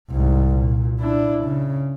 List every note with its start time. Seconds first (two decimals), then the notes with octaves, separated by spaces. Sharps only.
0.11 C2 G#2
0.55 A#2
0.99 D4 E4
1.45 C#3